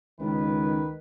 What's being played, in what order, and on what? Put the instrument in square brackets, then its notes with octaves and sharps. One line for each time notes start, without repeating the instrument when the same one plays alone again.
[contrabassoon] C#2 [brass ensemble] D#3 B4